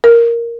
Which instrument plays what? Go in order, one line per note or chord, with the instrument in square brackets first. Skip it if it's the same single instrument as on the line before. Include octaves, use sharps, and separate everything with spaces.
[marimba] A#4